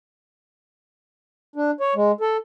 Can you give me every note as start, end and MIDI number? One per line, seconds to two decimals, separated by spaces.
1.56 1.71 62
1.80 1.94 73
1.96 2.12 56
2.21 2.37 69